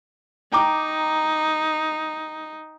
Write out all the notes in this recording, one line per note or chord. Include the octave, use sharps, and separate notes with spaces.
D#4 G5 A#5 D6